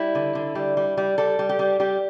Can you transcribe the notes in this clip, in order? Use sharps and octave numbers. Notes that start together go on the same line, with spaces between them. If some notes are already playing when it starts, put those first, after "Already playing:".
Already playing: G3 E4
D3
D3
G3
G3
G3
G3 A4
G3
G4
G3
G3 G4